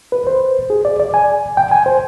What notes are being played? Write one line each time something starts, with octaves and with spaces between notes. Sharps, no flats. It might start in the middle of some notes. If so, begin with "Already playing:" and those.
B4
C5
G#4
D5
D5
G#5
G5
G#5
C5